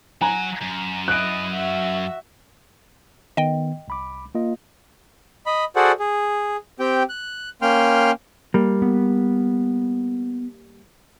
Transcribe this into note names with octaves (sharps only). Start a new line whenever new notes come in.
F#3 F#5 G#5 A#5
F#2
E4 D#5 F#6 D7
F#4 E5
D#3 B3 D#5 G5
C2 B5 D6
A#3 F4 D#5
D#5 B5
F#4 G#4 A4 C5 D5 F#5
G#4
C4 G4 G5
F#6
A#3 C#4 G5 C6 F6
G3 A#3
B3